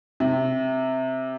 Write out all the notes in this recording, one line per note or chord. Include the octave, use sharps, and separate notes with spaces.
C3